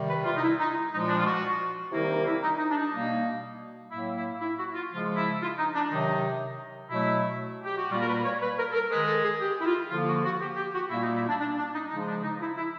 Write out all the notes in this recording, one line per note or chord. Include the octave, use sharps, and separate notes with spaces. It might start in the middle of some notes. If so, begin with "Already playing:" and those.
Already playing: C3 D#3 G3
B4
F4
D#4
E4
D#4
A#2 F3 G#3 D#4
D4
F4
F#4
C3 D#3 G3 A#3 E4
D#4
E4
D#4
D#4
D4
D#4
B2 G3 A#3
A2 F#3 A#3 E4
E4
E4
F#4
F4
C#3 F3 G#3 F4
E4
F4
D#4
D4
C3 D#3 F#3 D#4
B2 F#3 A3 E4
G4
F#4
A#2 G3 A#3 F4
A#4
B4
C#5
B4
A#4
A4
A#4
D#3 G#3 B4
A4
G#4
G4
E4
F4
D3 F3 A#3 F4
F#4
F#4
G4
G4
F#4
A#2 G3 A#3 E4
D#4
E4
D4
D4
D4
D#4
C#3 F3 G#3 D#4
D4
D#4
E4
E4